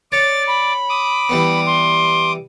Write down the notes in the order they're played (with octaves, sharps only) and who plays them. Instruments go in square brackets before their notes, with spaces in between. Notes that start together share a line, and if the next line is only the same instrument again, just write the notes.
[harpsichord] C#5 [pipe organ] D5 D6 [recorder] A6
[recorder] B5
[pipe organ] D6 D#6
[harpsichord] E3 G3 B3
[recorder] C6